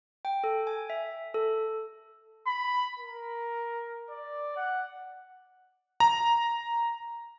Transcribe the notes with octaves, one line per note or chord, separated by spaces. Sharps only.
G5
A4
G#5
E5
A4
B5
A#4
D5
F#5
A#5